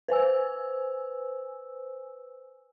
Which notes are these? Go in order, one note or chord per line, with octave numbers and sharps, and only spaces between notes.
B4 C5 G#5 E6